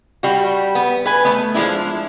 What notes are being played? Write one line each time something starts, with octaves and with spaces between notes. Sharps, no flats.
G3 F#4
B3
B4 G#5
A3 B3
F3 G#3 D4 E4